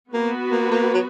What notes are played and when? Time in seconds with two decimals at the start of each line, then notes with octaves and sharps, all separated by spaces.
0.14 A#3 B3 F#4 B4
0.51 A#3
0.71 A#3
0.94 F#3